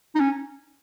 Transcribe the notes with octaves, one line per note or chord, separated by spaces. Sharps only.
D#4
C#4